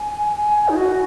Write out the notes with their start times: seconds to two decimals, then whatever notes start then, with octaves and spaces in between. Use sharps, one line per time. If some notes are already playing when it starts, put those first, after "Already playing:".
Already playing: G#5
0.35 G#5
0.69 D#4
0.76 F#4